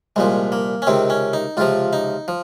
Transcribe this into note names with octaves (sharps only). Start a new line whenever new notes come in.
C2 A#2 F3 G#3
A#3
C#4
C#2 C3 D#3 C4
C#4
D#4
C#2 C3 F3 F4
D#4
F3